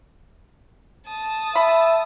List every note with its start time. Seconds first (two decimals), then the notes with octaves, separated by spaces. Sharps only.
1.08 A5 D#6
1.56 E5 B5